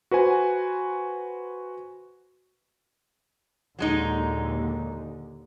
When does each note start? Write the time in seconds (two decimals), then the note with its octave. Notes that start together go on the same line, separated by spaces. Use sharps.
0.11 F#4 B4 C5 G#5
3.79 D#2 A#2 D3 F#3 G#3 D#4